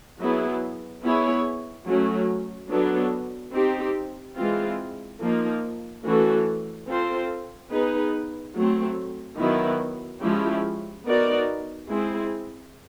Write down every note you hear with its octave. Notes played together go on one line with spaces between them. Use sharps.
F#3 B3 E4 G#4
B3 E4 G#4 C#5
F#3 A3 C#4
F#3 B3 D4 F#4 A4
C4 D#4 G4
E3 G#3 C4 F4
F3 A#3 D#4
E3 A3 C#4 F#4 A4
C4 F4 A4 C5
B3 D#4 G#4 B4
F#3 A3 C4
D#3 F#3 B3 E4
F3 G#3 C#4 E4 G4
B3 D#4 F#4 A#4 D5
G#3 C4 E4 G#4